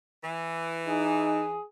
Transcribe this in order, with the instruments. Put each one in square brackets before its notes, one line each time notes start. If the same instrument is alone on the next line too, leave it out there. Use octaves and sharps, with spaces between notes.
[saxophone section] E3
[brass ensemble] D#4 [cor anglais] G#4